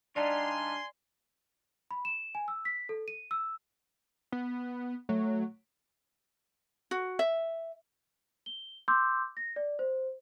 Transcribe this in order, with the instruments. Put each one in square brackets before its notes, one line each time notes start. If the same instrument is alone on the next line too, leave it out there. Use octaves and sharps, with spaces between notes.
[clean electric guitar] G3 D#4 F4 [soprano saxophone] D4 [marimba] D5 [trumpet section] G#5 C6
[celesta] B5
E7
G#5
E6
B6
A4
D#7
E6
[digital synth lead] B3
[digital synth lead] F#3 [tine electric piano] A3
[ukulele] F#4
E5
[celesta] G7
C6 D6 E6 G6
A#6
D5
C5